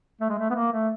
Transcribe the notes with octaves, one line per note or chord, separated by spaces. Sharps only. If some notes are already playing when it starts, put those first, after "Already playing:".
A3
G#3
A3
B3
A#3
A3